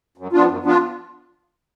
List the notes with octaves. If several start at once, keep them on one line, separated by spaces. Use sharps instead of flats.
F#2
F3 B3 D4 F4
F#2
F3 B3 D4 F4